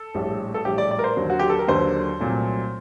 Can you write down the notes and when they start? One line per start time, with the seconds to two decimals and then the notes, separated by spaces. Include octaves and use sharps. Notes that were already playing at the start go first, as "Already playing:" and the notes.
Already playing: A4
0.14 A#1 A2 G3
0.54 A4
0.65 A#1 A2 G3 G4
0.78 D5
0.91 D5
0.99 A#4
1.04 C5
1.16 D#2 D3 F#3 A#3
1.30 F#4
1.39 G4
1.50 A4
1.59 A#4
1.68 D#2 D3 F#3 A#3 C5
2.20 C2 A#2 F#3 A3